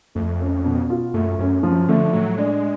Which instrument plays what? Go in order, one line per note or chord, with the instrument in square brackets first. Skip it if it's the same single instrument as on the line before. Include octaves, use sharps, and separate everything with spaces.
[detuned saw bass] F2 [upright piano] A3
[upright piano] C#4
B2
F4
[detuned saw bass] F#2 [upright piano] A3
[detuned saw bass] F#2 [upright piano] C#4
[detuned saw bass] F#2 [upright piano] F3
[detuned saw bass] D3 [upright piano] A3
[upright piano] A2 [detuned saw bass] F#3
[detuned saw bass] G#3 [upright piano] D4